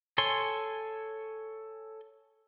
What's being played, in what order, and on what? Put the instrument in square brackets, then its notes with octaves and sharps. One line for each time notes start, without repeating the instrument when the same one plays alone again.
[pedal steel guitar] A4 C#5 G#5 C6